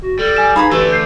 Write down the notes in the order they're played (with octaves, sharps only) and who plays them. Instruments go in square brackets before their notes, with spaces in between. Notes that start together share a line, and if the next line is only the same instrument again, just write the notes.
[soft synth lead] F#4
[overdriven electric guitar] G3 [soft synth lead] A4
[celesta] G#5 E7
[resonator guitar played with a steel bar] D#4 G#4 B4 [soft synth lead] F5 [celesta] B5
[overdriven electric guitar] D3 A3 [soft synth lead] E3 [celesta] G4 B4 [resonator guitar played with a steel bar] A4
[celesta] G6 C7